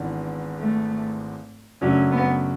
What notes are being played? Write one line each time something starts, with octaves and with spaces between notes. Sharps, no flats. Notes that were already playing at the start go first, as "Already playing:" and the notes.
Already playing: G#1 G#2 E3 B3 D4
A3
F#2 C#3 F#3 A3 C#4 D4
B3